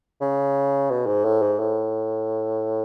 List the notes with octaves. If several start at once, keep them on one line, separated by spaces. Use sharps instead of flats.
C#3
B2
G#2
A2
G#2
A2